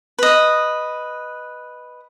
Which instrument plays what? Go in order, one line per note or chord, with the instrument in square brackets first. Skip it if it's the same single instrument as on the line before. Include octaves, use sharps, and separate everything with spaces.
[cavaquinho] B4 D#5